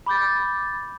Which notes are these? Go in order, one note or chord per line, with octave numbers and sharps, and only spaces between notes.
B5 D6 G6 A6